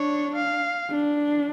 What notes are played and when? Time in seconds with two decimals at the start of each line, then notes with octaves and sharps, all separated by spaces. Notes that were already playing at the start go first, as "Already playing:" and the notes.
Already playing: D4 C#5
0.35 F5
0.90 D4